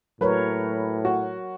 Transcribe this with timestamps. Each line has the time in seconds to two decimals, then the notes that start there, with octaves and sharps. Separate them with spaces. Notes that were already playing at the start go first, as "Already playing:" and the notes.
0.21 A2 F#3 A#4 B4 C#5
1.05 F#4